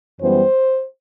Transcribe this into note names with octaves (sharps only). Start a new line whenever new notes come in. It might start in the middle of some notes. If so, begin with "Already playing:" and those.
F#2 E3 G3 B3 C5